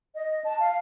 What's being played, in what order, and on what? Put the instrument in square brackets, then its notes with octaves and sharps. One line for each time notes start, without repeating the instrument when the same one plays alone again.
[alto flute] D#5
A5
F5